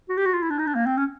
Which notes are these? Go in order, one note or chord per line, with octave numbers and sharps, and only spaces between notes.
F#4
G4
F#4
F4
E4
D4
D#4
D4
A#3
C4
C#4